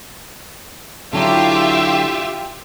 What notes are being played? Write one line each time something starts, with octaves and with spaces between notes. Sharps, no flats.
D3 F#3 E4 F4 G4 E5